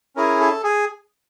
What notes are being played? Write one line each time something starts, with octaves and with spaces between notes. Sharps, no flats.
C#4 E4 G#4 A#4
A4
G#4